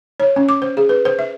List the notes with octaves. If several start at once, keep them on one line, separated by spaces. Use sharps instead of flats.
C#5
C#4
D6
C5
G#4
B4
C5
E5